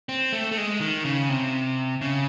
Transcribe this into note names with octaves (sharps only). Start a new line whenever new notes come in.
C4
A3
A3
G#3
D#3
C#3
C3
C#3